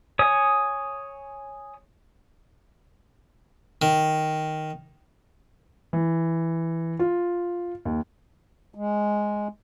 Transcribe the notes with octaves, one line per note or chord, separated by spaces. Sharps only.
C#5 G#5 D#6
D#3
E3
F4
D#2
G#3